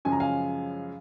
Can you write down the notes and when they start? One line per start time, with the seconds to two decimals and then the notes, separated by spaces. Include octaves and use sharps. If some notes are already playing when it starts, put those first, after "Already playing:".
0.05 F#2 C#3 F3 G#3 G#5
0.12 A#5
0.20 F5 G#5